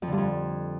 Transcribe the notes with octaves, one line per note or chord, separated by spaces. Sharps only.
F2
D3
G2
F2